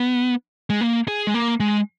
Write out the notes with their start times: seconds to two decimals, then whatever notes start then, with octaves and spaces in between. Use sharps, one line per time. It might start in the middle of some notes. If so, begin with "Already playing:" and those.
Already playing: B3
0.70 G#3
0.81 A#3
1.08 G#4
1.27 G#3
1.34 A#3
1.60 G#3